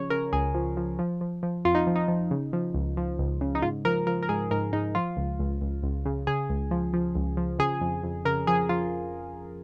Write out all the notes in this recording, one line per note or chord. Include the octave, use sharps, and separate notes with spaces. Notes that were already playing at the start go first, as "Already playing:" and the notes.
Already playing: C#3 F3 C#5
C#3 A#4
C#2 G#4
F3
F3
F3
F3
F3
F2 F4
D#4
F3
D#4
F3
C#3
F3
C#2
F3
C#2
C#3
D#4
G#2 F4
F3 A#4
F3 A#4
A#4
G#2 G#4
G#2 A#4
G#2 D#4
F3 F4
C#2
C#2
C#2
C#2
C#3
C#3 G#4
C#2
F3
F3
C#2
F3
C#3 G#4
F2
F2
C#3 A#4
F3 G#4
F3 F4